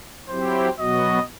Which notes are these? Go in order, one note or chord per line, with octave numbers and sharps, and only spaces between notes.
F#3 C4 E4 G4 C5
B2 F#3 B3 F#4 D#5